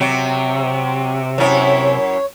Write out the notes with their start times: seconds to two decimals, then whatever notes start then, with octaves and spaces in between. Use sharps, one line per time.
0.01 C3 F#3
1.38 F#2 E4 C#5